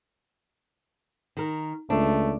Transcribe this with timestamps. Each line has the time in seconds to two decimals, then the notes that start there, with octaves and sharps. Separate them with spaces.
1.37 D#3 A#4
1.90 C#2 A3 D4